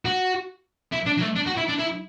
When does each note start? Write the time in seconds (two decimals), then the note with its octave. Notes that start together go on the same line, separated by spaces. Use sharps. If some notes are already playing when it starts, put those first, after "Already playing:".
0.05 F#4
0.92 E4
1.06 D4
1.18 F#3
1.22 A3
1.36 D4
1.47 F#4
1.57 E4
1.69 D4
1.79 E4